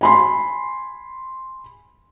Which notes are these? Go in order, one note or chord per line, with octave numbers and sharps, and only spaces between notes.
G#5 B5 C6